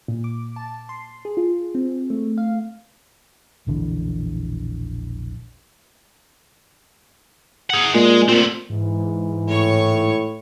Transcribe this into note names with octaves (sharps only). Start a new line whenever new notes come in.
A#2
D6
A5
C6
G#4
F4
C4
A3
F5
E1 A#1 D3 E3
G#4 F#5
A#2 G#3
A#2 A3 C4
G#2 E3
A2 C#5 C#6